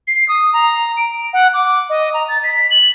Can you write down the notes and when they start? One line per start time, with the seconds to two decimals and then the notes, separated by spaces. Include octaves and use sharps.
0.07 C7
0.29 D#6
0.53 A#5
0.97 D7
1.33 F#5
1.54 D6
1.90 D#5
2.14 A#5
2.29 A6
2.44 B6
2.71 F#7